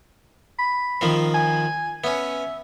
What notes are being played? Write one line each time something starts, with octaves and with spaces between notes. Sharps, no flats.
B5
D#3 F3 C4
G#5
B3 C#4 E5